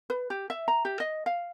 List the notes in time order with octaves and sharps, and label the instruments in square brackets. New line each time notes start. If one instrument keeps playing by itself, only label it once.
[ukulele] B4
G4
E5
A#5
G4
D#5
F5